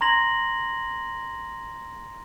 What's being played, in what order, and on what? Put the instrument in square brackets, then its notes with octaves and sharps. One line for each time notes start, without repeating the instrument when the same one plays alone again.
[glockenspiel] A#5 C6 G#6 A#6 F#7